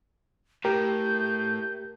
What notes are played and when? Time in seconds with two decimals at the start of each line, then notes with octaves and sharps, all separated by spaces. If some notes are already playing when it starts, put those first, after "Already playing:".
0.65 A2 G4 A#4 G6